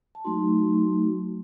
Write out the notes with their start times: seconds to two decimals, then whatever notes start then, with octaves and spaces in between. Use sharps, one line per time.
0.15 A5
0.24 F#3 A3 D#4 F#4 C6